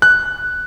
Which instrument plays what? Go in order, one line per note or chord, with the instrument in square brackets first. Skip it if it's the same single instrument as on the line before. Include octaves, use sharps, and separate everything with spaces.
[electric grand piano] F#6